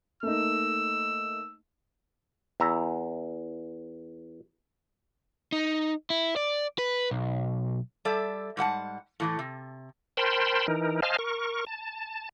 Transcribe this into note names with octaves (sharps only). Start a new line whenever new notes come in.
A3 A#3 D#4 E6
E2 E5 A#5
D#4
E4
D5
B4
B1
G3 A4 D5 E5
G#2 G3 F#5 A5
A2 E3 A3
C3
A#4 C5 G5 A5 B5 C6
E3 D#4 A#4
C5 D#5 F5 G#5 A5 F6
A#4 C#6
A5